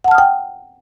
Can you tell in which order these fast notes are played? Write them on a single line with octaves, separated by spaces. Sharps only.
F#5 A5 F6 D#6 G5